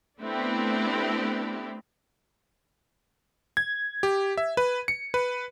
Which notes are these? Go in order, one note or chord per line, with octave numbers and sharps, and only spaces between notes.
A3 B3 C4 D4 E4 G4
G#6
G4
E5
B4
C#7
B4